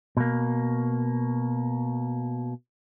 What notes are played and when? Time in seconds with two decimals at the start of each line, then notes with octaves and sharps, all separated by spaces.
0.17 B2 A#3